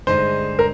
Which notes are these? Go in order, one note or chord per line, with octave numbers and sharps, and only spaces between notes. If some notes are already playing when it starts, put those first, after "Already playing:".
G2 D3 G#3 D#4 G#4 C5
A#4